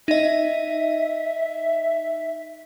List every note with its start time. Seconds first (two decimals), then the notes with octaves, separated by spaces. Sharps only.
0.08 D#4 D#5 E5